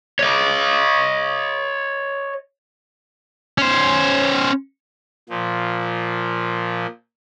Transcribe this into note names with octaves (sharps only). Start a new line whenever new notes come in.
C#5 D#5
C#4 C5
A#2 F3